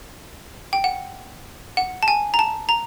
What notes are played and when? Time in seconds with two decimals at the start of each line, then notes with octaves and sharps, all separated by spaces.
0.73 G5
0.84 F#5
1.77 F#5
2.03 A5
2.08 G#5
2.34 A#5
2.39 A5
2.69 A#5